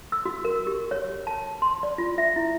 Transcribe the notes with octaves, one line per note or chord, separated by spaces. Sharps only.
E6
F#4
A#4
G4
C#5
A5
C6
D5
F4
E5
E4